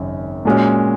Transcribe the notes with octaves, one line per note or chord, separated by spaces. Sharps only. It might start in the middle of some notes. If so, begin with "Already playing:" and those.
Already playing: G#1 F#2 C#3
A#2 G#3 C#4 F#4